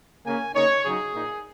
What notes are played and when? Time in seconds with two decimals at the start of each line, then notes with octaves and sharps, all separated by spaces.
0.25 C#3 A#3 C#4 G#5
0.54 C#3 A#3 D#4 C#5
0.84 C#3 F#3 D#4 G#4
1.14 A#2 A#3 D#4